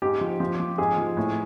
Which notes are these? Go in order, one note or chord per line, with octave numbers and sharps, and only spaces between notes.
G#2 G4
F3
F3
F3
G#2 G#4
F3
A2